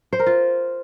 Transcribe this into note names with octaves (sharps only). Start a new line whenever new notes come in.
C5
A#4
F4